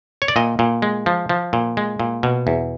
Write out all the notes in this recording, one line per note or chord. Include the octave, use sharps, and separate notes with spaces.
C#5
D5
A#2 D#5
A#2
G#3
F3
F3
A#2
G#3
A#2
B2
E2